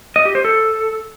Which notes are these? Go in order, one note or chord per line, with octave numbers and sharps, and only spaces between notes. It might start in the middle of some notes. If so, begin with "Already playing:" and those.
D#5
G4
C5
A4